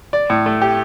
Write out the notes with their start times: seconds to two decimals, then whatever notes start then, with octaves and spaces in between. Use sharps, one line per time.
0.13 D5
0.30 A2
0.46 A3
0.62 G4